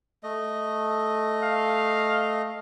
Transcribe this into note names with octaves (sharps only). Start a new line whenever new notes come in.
A3 D#5
F5